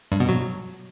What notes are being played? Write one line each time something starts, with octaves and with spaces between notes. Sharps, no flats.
G2
B2
F#3